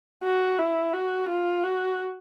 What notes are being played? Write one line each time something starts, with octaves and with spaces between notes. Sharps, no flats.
F#4
E4
F#4
F4
F#4